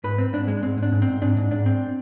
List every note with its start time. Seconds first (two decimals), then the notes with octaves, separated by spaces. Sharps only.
0.04 G#2 B4
0.18 C4
0.33 G#2 D4
0.48 G#3
0.62 G#2 C4
0.77 G#2
0.82 D4
0.92 G#2
1.02 C4
1.07 G#2
1.22 G#2 D4
1.37 G#2
1.51 G#2 D4
1.66 C4